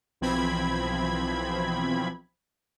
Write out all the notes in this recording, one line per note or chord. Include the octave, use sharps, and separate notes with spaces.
B1 E3 F3 C4 B5 G#6